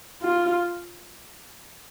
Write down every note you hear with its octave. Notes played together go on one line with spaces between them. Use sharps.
F4